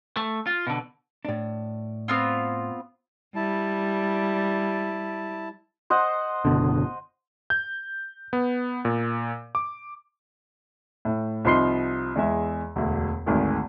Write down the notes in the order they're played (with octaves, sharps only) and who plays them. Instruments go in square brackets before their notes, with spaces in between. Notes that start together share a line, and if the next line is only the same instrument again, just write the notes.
[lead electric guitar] A3
F4
B2 D3
[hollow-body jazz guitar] A2 D4
[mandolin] B3 C4 F4
[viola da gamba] G3 [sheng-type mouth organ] E4 A5
[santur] C5 D#5 F#5
[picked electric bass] F#1 B2 D3
[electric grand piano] G6
B3
A#2
D6
[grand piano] A2
C2 F3 D#4 C6 C7 G7
E2 G#3 E5
E1 D2
G#1 D2 D#3 G#3